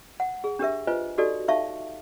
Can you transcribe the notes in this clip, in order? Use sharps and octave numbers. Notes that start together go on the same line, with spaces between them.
F#5
G#4
D4 G4 A#4 E5
F4 B4 C5 D#5 G#5
D#4 F#4 G4 A4 D5 D#5
D#4 E5 F5 A5 C#6